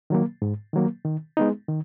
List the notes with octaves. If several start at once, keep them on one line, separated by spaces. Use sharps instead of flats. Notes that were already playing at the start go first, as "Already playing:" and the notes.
D#3 F#3 A#3
G#2
D#3 F#3 A#3
D#3
G#3 B3 D#4
D#3